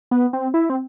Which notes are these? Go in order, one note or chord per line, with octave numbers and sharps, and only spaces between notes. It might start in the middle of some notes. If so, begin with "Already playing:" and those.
B3
C4
E4
C4